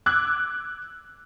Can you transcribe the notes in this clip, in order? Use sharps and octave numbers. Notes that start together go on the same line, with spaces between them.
D6 E6 F#6 G#6